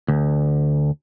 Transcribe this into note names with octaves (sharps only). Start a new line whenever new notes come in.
D2